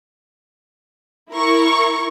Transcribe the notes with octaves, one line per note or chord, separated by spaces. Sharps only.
E4 A#4 C#6